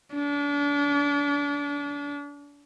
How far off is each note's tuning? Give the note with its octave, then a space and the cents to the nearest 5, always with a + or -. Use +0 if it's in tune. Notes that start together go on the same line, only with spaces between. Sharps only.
D4 -35